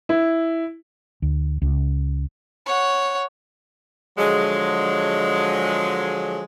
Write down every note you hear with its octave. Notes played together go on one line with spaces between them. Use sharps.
E4
D2
C#2
C#5 F#5
D3 F3 F#3 G#3